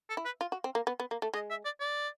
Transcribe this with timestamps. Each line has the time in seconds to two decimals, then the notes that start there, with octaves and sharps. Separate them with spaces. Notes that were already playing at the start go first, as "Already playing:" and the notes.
0.09 A4
0.17 E4
0.25 B4
0.41 F4
0.52 F#4
0.64 C4
0.75 A#3
0.87 B3
1.00 B3
1.11 A#3
1.22 A3
1.34 G#3 D#5
1.50 E5
1.65 D5
1.80 D5